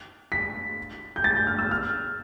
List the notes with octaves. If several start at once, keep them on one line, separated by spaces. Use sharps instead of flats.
B6
G6
A6
G6
F6
E6
F6